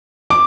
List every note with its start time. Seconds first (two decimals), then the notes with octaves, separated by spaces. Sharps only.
0.30 D6